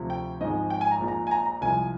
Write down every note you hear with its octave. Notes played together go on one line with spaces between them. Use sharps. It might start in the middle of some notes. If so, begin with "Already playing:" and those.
Already playing: D2 C3 F3
G5
G#1 G#2 F3 G#3 D#5
G5
G#5
A#5
A#1 A#2 G#3
A#5
G#5
A#5
A#5
C2 C3 F3 G#3 G#5